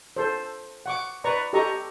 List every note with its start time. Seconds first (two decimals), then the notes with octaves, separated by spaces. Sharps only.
0.16 A4 C5
0.86 F#5 C#6 D6
1.24 B4 D5 A#5 C#6
1.53 G4 A4 D#5 A#5 C#6